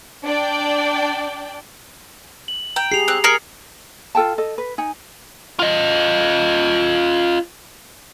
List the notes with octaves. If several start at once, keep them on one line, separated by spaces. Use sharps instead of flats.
D4 D5 G5
F#7
G5 A#5
G4 G#4 C7 F7
C4 F#6
G#4 A#4 F6 C7 C#7
F4 A4 G5 A5
A4 D#5
B4
D#4 G#5
F4 D#5